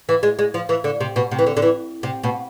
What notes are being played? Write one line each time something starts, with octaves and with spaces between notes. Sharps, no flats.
E3
G#3
G#3
F3
E3
D3
C3
B2
C3
E3
D3
D3
E3
C3
B2